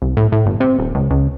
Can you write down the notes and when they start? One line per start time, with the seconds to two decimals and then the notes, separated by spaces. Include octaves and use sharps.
0.02 C2
0.17 A2
0.32 A2
0.46 G1
0.60 C3
0.79 D#1
0.95 C#2
1.10 C#2